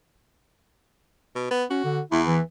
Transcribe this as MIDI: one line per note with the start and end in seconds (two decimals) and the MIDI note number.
1.35 1.50 47
1.51 1.65 59
1.70 1.80 61
1.70 2.00 66
1.84 2.01 50
2.12 2.38 40
2.12 2.21 64
2.26 2.41 52